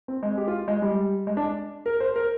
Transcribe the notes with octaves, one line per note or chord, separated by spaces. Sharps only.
C4
G#3
G4
F4
G#3
G3
G#3
D4
A#4
C5
A#4